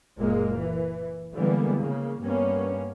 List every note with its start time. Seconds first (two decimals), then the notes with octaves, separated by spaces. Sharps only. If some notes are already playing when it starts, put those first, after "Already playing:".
0.18 F#1 A#2 G#3 A#3
0.54 E3
1.34 D3 E3 G3 G#3 A#3 B3
1.76 C#3 A#3
2.21 G2 A#3 B3 C#4